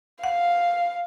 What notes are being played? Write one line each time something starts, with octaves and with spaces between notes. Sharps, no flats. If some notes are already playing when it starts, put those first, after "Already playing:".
F5 F#5